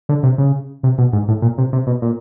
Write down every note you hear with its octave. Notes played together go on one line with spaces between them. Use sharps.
D3
C3
C#3
C3
B2
G#2
A2
A#2
C3
C3
B2
A#2